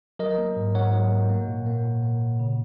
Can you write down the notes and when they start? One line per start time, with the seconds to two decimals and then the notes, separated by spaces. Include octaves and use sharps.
0.19 F#3 A#4 D#5
0.38 A#3
0.56 G#2
0.75 G#2 C#5 F#5
0.93 F#3
1.11 A#3
1.30 A#3
1.48 A#2
1.66 A#3
1.84 A#2
2.03 A#3
2.21 A#2
2.39 C#3